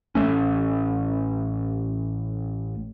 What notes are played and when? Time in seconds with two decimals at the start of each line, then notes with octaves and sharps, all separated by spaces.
0.15 A1 A3 C#4